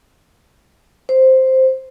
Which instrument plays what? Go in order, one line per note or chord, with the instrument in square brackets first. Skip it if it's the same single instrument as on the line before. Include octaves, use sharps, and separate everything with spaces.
[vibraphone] C5